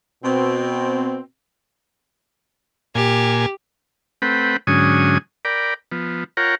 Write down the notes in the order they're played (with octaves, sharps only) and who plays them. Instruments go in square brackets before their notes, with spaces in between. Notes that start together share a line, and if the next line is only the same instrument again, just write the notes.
[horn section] B2 C4
[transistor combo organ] A#2 G#5 [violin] G4
[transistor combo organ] A3 C4 B4 F#5 G5 B5
G#2 D3 F#3 C#4 G#5 D#6
A#4 D5 G5 B5
F3 B3
F4 A#4 C#5 F#5 G5 A#5